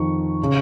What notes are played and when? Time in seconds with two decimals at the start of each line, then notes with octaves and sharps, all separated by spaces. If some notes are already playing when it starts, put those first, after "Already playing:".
Already playing: F2 D#3 C#6
0.44 C#3